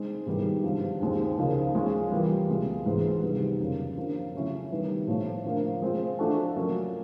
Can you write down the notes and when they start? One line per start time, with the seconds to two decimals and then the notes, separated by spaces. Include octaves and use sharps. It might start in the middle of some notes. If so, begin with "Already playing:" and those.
Already playing: G#3 C4 D#4
0.26 G#2 D#3 G3 B3 E4
0.63 G2 D3 F3
1.01 D#2 D#3 G#3 C4
1.38 C#2 C#3 F3 A#3 D#4
1.75 F3 G#3 C#4 F4
2.12 E3 G3 A#3
2.49 C#2 B2 G#3 C#4 F4
2.86 G#2 E3 G#3 C4
3.22 C3 D#3 G3 B3 D#4
3.59 F2 C#3 F#3 A#3
3.97 D3 F3 A#3
4.34 C#3 F#3 A3 C#4 E4
4.70 D#3 G3 B3 E4
5.07 A2 F3 A3
5.45 D3 F3 A#3
5.82 G#3 C4 F4
6.19 F3 A3 D4 F#4 A4
6.56 F#3 A#3 C#4 F4